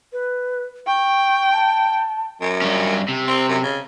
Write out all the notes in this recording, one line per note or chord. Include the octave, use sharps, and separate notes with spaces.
B4
G5 C#6
A5
F#2
G2 C#4
C3
C4
F#2
C#3